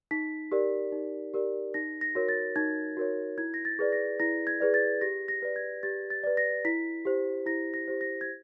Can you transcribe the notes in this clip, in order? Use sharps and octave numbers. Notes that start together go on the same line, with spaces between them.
D#4 B6
G4 A#4 D5
D#4
G4 A#4 D5
D#4 A#6
A#6
F#4 A#4 C#5
A6
D#4 G#6
F#4 A#4 C#5
E4 G#6
A#6
A6
G#4 B4 D5
A#6
E4 A#6
G#6
G#4 B4 D5
A6
G4 A#6
A#6
B4 D5
G#6
G4 A6
A6
B4 D5
A#6
E4 B6
G4 C5
E4 A#6
A#6
G4 C5
A#6
G#6